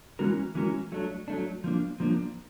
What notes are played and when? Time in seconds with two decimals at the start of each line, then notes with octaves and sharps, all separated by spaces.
0.19 E3 G#3 C#4 F#4 A#4
0.55 E3 G#3 C#4 F#4 A#4
0.92 F#3 A3 D4
1.28 F#3 A3 D4
1.64 F3 A#3 D4
2.00 F3 A#3 D4